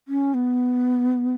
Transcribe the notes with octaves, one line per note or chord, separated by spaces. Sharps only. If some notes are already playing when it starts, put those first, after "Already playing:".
C#4
B3